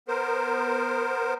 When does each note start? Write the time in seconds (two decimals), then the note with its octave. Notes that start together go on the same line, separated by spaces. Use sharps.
0.08 B3 A#4 C5